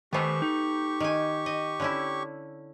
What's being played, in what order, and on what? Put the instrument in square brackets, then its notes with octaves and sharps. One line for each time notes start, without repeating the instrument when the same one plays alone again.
[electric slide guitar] D#3 C5 [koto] A3 B3 [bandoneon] G4 C#6
[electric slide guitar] D#4
[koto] D#3 G#5
D#5
D3 C#4 E4